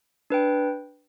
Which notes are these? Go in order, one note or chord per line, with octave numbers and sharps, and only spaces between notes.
D4 B4 G5